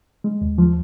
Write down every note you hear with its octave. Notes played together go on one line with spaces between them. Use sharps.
G#3
D#2
F3